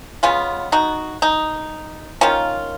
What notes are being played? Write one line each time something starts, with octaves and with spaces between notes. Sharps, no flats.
C#3 G#3 B3 C#4 F4
D#4 F#4
D#4
D#3 A#3 C#4 F4